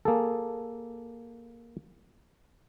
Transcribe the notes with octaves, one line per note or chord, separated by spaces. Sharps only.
A#3 G#4 A4